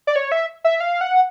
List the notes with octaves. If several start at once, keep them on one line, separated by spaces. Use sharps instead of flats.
D5
C#5
E5
E5
F5
F#5